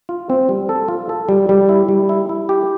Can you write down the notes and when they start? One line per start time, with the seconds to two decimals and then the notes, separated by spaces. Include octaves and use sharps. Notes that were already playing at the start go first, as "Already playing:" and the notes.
0.09 F4
0.30 C4
0.49 G3
0.69 A4
0.88 F4
1.09 A4
1.29 G3
1.49 G3
1.69 E4
1.89 G3
2.09 E4
2.29 E4
2.49 G4